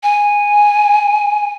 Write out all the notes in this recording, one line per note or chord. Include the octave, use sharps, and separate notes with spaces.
G#5